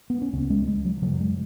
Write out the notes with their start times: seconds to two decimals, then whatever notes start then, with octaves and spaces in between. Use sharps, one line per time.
0.10 B3
0.22 C#4
0.33 C#2 C#3 B3
0.50 G#3
0.68 G#3
0.85 F#3
1.02 C#3 F#3
1.06 F#2
1.21 G#3